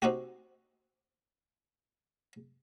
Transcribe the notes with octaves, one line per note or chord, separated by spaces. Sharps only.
C4 D#4 F#4 G4